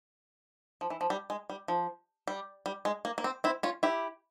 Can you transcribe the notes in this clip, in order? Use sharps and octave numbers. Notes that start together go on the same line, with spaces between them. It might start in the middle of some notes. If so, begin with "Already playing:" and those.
F3
E3
F3
G3
G#3
G3
F3
G3
G3
G#3
A#3
A#3
C4
C4 E4
C#4 F4
E4 G4